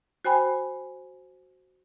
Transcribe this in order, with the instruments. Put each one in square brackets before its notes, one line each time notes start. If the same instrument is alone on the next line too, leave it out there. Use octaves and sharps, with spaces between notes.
[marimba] F#4 C5 G5 G#5 B5